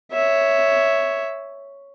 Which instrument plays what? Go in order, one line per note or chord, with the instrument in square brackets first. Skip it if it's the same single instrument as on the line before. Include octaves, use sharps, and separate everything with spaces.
[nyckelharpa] C#5 E5